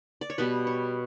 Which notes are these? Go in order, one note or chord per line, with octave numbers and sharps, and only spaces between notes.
D5
C#5
B2 G3 B3 B4
C#5